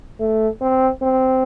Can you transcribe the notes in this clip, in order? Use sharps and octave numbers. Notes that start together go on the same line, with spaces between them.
A3
C4
C4